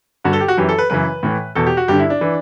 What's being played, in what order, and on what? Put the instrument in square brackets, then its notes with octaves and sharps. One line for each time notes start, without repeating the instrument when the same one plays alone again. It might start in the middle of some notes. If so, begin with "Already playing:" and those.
[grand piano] G2 D3 F#4
A4
G4
F#4
F#2 E3 G4
A4
B4
F#2 C#3 E3 B4
A2 E3
E2 B2 A4
G4
F#4
G2 D3 G4
E4
D4
E3